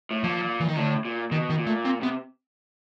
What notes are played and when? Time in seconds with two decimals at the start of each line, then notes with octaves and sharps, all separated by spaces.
0.11 A2
0.23 A#2 F3
0.60 E3
0.68 D#3
0.77 A2 D3
1.05 A#2
1.31 B2 D#3
1.50 D#3
1.58 A#2
1.67 A3
1.85 C4
2.01 C3 B3